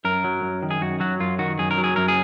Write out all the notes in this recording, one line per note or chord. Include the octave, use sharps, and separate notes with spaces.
F#2 A#4
F#3
F#2
D#3
G#4
F#2 F#4
F#3 F#4
F#2 F4
D#3 F#4
F#2 G#4
A#4
F#3
G#4
F#2 A#4
G#4